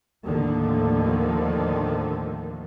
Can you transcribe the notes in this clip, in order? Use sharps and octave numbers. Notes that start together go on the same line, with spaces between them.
D#2 A2 D3 D#3 F3 A3